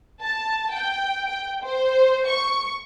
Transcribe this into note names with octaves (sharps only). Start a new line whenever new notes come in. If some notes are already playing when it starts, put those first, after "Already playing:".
A5
G5
G5
C5
C#6